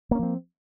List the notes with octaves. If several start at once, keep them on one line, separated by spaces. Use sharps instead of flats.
F3 A#3 C4 C#4